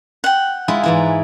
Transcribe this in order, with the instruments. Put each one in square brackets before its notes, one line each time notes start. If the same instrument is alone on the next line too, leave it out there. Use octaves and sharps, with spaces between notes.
[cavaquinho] F#5 G5
[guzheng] G#3 E4 F4
G#2 E3 E4